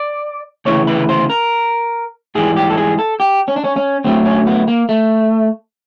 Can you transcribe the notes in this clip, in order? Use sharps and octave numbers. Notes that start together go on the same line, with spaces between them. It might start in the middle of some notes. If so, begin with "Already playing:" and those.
Already playing: D5
D2 C#3 E3 C#5
B4
C5
A#4
G#2 E3 G3 G#4
G4
A4
G#4
A4
G4
C#4
D4
C#4
C#4
D2 D3 F#3 A3 C4
C#4
B3
A#3
A3